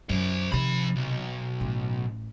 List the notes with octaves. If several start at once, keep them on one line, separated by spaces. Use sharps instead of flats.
F#2 C5 D5
C3 D#3 F3 B5
B1
A1